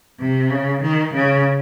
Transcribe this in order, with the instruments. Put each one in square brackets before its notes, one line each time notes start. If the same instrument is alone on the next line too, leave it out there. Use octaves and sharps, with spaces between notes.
[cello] C3
C#3
D#3
C#3